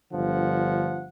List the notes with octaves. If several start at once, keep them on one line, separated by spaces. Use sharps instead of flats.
G1 D3 F3 F#5